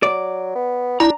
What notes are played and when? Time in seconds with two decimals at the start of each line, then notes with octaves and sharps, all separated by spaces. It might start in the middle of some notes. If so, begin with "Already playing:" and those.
0.03 F#3 D5
0.55 B3
1.00 D4 E4 A#5